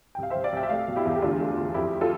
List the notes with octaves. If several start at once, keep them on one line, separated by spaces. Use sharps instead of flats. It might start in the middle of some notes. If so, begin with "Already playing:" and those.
C2 G5
F5
C2 C5 E5
D5 F5
C2 E5 G5
E5
A3 D5 F5
B2
E4 G4
E2
G4
D2 D4 F4
A3
D2
F2 E4 G4
F4 A4